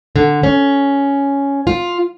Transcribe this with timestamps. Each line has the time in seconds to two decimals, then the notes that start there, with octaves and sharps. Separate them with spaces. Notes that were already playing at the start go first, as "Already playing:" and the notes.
0.16 D3
0.43 C#4
1.67 F4